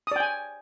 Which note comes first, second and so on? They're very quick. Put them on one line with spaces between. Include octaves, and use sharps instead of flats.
D#6 D5 G5 G#5